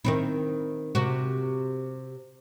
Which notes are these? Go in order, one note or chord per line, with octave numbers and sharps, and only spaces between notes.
D#3 C4 E4
C3 F#4